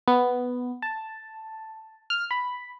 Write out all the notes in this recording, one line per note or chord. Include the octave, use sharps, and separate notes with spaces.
B3
A5
F6
B5